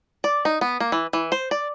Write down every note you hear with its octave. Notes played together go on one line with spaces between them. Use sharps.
D5
D#4
B3
A#3
E3
E3
C5
D5